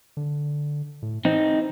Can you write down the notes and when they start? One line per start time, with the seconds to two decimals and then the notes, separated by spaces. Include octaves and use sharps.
0.17 D3
1.02 A2
1.25 E3 C4 D#4